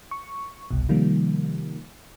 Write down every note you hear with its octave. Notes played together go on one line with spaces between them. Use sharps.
C#6
G1 C2 B2
C3 D#3 F3 G3 A#3